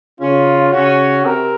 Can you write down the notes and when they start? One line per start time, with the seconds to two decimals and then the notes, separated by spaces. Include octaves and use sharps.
0.21 C#3 C#4 F4
0.72 C#3 C#4 F#4
1.25 C3 C4 A#4